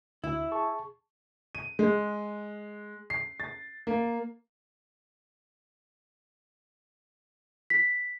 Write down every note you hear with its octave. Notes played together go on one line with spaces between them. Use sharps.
D2 E4
G#4 A5 C#6
D#7
G#3
C7
A6
A#3
B6